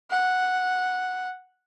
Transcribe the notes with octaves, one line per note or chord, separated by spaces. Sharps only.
F#5